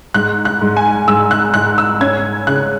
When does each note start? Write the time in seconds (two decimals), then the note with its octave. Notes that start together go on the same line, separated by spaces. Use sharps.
0.14 G#2 F#6
0.45 F#6
0.61 G#2
0.77 G#5
1.07 G#2 E6
1.31 F#6
1.54 G#2 F#6
1.78 E6
2.01 C#4 G#6
2.47 C#3 F#6